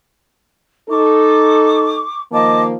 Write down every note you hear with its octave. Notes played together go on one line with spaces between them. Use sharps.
D#4 A4 C#6 D6
D#3 F3 A#3 D#5 A5 D6